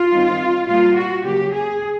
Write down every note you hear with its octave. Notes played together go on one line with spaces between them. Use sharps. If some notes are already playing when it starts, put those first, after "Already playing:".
Already playing: F4
D#3 G3 C4 D#4
A#2 G3 A#3 F4
F#4
C#3 F#3 A#3 G4
G#4